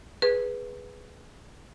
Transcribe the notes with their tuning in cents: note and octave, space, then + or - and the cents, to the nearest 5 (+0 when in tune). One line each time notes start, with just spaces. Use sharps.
G#4 +0 B4 +0